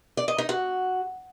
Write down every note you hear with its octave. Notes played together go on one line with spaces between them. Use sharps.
D5
D#5
D#4
F#4